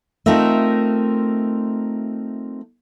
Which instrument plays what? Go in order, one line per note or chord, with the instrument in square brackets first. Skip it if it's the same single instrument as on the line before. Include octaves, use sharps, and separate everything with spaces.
[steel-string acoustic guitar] A3 C4 D#4 F4 A#4 E5